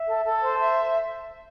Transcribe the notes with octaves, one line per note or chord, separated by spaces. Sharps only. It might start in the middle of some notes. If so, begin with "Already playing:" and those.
Already playing: E5
A4
A4
C5
E5